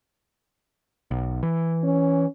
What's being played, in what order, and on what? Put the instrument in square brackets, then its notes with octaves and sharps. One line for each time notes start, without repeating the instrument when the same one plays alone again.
[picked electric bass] B1
E3
[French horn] C#4